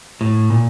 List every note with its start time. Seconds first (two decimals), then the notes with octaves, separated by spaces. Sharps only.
0.21 A2
0.50 A#2